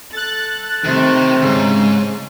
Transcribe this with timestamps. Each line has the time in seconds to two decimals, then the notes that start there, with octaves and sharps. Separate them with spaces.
0.12 A4 F#6 A6
0.84 C3 D#3 A3
1.42 E2 G#2 C#3